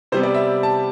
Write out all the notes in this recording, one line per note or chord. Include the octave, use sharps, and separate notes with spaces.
C3 G3 B3 C5
D5
E5
A5